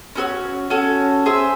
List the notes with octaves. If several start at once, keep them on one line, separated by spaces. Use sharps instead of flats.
C#4 F#4 A4 C#5
C#4 F#4 A4 C#5
G#4 C5 E5